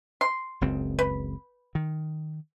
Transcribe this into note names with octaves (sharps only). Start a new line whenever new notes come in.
C6
F#1 C#2 C4
B4
D#3